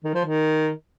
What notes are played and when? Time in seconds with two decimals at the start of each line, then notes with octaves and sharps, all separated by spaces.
0.04 D#3
0.14 F3
0.24 D#3